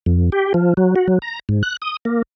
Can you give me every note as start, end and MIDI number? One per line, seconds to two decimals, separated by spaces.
0.06 0.30 41
0.32 0.53 67
0.54 0.74 53
0.77 0.95 54
0.96 1.07 66
1.08 1.19 54
1.22 1.39 82
1.49 1.63 44
1.63 1.77 90
1.82 1.97 87
2.05 2.22 58